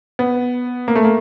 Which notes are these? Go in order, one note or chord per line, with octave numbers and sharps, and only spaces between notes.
B3
A#3
A3
A#3